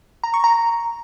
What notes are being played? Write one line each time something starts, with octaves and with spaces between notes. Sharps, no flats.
A#5
C#6
A#5